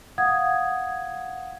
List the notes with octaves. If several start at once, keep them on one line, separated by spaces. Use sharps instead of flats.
F5 F#5 D#6 G#6